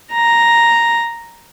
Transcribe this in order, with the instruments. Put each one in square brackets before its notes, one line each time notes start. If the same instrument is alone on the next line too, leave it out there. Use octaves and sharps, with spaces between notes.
[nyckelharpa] A#5